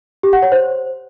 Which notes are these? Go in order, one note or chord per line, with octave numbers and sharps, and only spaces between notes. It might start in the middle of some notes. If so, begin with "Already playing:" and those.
G4
F#5
C#5
C5